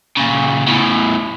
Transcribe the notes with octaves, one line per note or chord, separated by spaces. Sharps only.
A#2 C#3
E2 A2